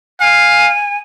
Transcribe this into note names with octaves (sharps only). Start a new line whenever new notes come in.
F5 G#5